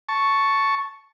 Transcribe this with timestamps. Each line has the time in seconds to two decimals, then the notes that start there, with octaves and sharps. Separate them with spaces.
0.09 A5 C#6